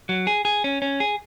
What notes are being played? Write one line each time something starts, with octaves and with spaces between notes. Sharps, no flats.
F#3
G#4
G#4
C#4
C#4
G#4